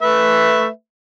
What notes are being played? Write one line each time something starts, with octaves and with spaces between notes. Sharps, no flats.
A3 B4 E5